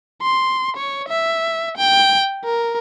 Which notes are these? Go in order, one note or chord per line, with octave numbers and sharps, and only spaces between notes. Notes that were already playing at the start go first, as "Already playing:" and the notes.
C6
C#5
E5
G5
A#4